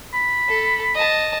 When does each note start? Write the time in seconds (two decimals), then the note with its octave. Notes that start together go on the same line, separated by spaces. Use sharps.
0.14 B5
0.49 A4
0.95 D#5 A5